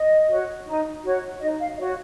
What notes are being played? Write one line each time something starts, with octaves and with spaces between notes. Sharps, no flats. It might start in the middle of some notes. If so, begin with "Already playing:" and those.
Already playing: D#5
F#4 C#5
D#4
F#4 C#5
D#4 D#5
F5
F#4 C#5 D#5